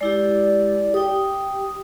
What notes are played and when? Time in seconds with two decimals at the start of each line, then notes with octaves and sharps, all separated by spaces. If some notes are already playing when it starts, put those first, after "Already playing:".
0.01 G#3 E4 G4 D5
0.94 G4 G5 D#6